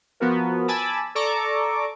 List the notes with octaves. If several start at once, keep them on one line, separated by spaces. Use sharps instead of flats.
F3 B3 F#4 A#4
G#5 A5 B5 D6 E6 A6
A4 D5 A#5 C#6 D6